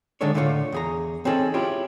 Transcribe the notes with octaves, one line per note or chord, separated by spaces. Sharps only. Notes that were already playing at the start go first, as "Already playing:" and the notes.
D3 D#3 G#3 D4 A4 C#5
A2 D3 A3 F4 C#5 F5
E2 G#4 A#5
C4 C#4 D#4 G#4 A4
C#4 E4 F4 G4 G#4 C#5